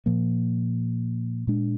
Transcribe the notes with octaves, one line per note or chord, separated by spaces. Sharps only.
A#2 F3 A#3
A#2 G#3 D4